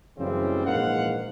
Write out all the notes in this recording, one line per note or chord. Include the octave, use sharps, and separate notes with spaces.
F#2 A2 C#3 E3 G3 C4
A#1 G#2 E3 A#3 F5 F#5